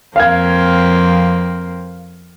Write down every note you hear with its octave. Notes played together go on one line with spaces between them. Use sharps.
F2 A#3 C4 F5 G#6